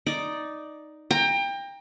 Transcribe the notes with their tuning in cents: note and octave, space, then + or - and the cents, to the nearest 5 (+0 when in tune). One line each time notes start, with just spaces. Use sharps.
D#4 +0 D5 +0
G5 +25 A#5 +0